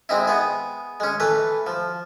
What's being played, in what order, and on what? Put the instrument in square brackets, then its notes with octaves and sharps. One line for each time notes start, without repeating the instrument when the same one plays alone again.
[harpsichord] G#3 C4 D#4 E4
B3 G#4
G#3 C#4
E3 A3 B4
F3